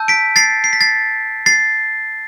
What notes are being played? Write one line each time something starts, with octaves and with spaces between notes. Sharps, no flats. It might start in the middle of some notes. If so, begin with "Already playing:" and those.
Already playing: A5 E6 G6
B6 D7
A6 C7
C7
B6
A6 C7
A6 C7